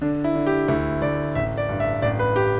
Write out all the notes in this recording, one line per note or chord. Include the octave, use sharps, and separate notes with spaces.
D3 D4
E4
D3
G4
D2 E4
D2 D5
A1 E5
D5
G2
E5
A1 D5
B4
G4